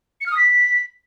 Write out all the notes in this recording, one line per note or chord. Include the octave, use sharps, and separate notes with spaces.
C#7
F6
D#6
B6